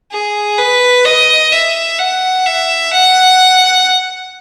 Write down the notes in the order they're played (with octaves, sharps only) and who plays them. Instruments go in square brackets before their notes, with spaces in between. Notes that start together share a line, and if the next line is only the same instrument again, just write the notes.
[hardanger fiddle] G#4
B4
D#5
E5
F#5
E5
F#5